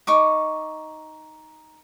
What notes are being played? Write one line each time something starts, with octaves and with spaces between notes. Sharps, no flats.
D#4 C#6 D6